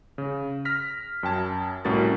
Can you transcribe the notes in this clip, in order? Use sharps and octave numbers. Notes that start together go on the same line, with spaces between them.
C#3
F6 A#6 B6
F#2 G5 A5 G#6
C2 A2 C#4 F#4 A#4 A6